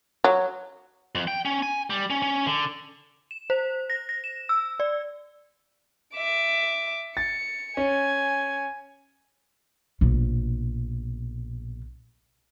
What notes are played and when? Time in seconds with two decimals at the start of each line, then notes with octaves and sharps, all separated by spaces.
0.24 F#3
1.15 F2
1.27 G5
1.45 C#4
1.62 G#5
1.90 G3
2.10 C#4
2.22 C#4
2.47 D3
3.31 E7
3.50 C5
3.90 A#6
4.09 A#6
4.24 E7
4.49 E6
4.80 D5
6.15 E5 D6
7.17 A6 C#7
7.77 C#4 G#5
10.01 A#1 B2